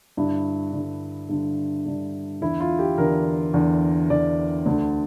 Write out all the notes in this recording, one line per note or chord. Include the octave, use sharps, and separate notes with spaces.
G2 D3 E4
G2 D3
G2 D3
G2 D3
E2 D3 E4
F4
G4
E2 D3 A#4
E2 D3
E2 D3 D5
D2 D3